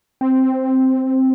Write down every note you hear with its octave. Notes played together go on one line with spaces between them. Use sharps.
C4